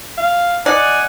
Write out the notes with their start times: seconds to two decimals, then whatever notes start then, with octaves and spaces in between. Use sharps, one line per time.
0.18 F5
0.66 D#4 D5 F#5 G#5